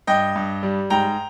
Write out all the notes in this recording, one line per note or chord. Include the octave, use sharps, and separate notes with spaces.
G2 D#5 G5
G2
G3
G#2 G5 A#5